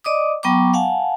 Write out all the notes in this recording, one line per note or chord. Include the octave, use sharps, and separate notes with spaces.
D5 D#5 D6 D#6
F#3 B3 G5 A#5 C#6 D6
F5 F#5 G#5 A5